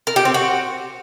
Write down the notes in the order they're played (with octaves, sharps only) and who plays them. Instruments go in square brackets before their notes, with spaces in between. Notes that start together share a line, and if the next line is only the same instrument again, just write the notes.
[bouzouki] A#4
G4
C4
F#4